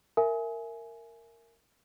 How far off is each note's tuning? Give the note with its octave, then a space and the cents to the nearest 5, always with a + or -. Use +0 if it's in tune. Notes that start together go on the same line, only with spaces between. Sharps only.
A#4 -15 E5 +15 G#5 +15